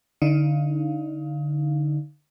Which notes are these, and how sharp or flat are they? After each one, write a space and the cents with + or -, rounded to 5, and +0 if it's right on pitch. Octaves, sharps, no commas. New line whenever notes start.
D3 +0 D#4 +25 F5 +0